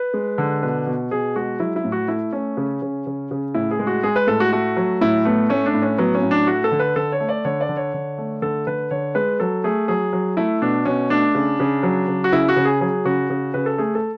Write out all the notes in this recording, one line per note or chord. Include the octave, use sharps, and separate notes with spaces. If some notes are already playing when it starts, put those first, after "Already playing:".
Already playing: B4
G#3
D3
B2 B4
B2
B2 G#4
G#3 F#4
F#3 E4
E4
A2
F#4
A3 E4
A3 C#4
C#3
C#3
C#3
C#3
A2 E4
G#4
G#3
F#4
G#3 G#4
B4
A2 A4
F#4
A3 F#4
F#3
A2 E4
A3 B3
A3 C#4
D4
A2
C#4
F#3 B3
C#4
A2
D4
A3 F#4
A4
D3
B4
D3 A4
C#5
A3
D5
D3 C#5
D5
D3
C#5
D3
A3
D3 A4
D3 B4
D3 C#5
G#3 B4
F#3 A4
A3 G#4
F#3 G#4
F#3
A3 E4
B2 D4
B2 C#4
A3 D4
C#3
C#3
F#3
C#3
F#4
C#3 E4
F#4
C#3
G#4
F#3 G#4
C#3 F#4
C#3
C#3 B4
A4
A3 G#4
A4